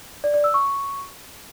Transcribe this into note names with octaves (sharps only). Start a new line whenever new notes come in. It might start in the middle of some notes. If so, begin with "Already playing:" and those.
D5
D5
E6
C#6